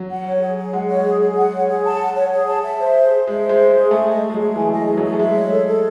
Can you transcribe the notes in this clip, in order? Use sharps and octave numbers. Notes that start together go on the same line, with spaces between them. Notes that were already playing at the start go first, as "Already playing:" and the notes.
Already playing: F#3
F#5
C#5
G#4
G#4
G#3 F#5
C#5
G#4
G#4
F#5
C#5
G#4
A5
F#5
C#5
G#4
A5
E5
C5
G#4
G#4
G#3 E5
C5
G#3
G#4
G#3
G#4
A3 G#5
D#5
G#4
G#3
F#3
G#4
E3 G#5
D#5
G#4
F#3
G#4
A3
G#3 E5
C#5
A4
A4